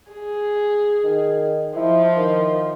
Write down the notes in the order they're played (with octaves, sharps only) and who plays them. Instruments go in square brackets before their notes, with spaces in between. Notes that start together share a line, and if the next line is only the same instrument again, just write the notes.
[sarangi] G#4
[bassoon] D#3
[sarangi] F3 [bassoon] E4
[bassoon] D#3